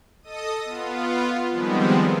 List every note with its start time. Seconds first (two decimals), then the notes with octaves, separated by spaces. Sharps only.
0.23 A4 D#5 D#6
0.65 B3 F4
1.51 D#3 F3 G3 G#3 B3 C4